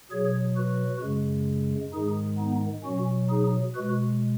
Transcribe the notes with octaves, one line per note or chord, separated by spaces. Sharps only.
B2 F#3 G#4 C#5
F#4 B4
F#2 C#3 G#3
G#2 D#3 G#3 D#4 G#4
B3 D#4
B2 F#3 C#4 F#4
D#4 G#4
B2 G#3 F#4 B4